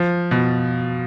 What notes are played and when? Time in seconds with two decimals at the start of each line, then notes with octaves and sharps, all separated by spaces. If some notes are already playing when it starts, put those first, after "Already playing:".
Already playing: F3
0.31 B2